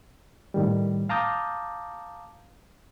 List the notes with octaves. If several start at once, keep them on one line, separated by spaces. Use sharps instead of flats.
A2 D#3 G3
F5 A5 A#5 D6 D#6 G6